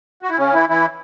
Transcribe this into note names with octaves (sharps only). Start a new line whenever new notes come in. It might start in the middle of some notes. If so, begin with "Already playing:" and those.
F#4
E4
C#3 C#4
E3 E4
E3 E4